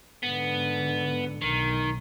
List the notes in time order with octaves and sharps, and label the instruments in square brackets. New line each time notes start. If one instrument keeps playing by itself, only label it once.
[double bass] G#2 D3 [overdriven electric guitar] B3
[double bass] B1 [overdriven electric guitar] D#3